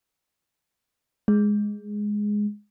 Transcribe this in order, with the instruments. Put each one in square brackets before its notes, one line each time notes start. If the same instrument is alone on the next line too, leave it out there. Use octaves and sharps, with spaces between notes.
[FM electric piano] G#3